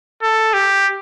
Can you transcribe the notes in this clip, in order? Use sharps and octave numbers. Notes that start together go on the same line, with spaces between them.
A4
G4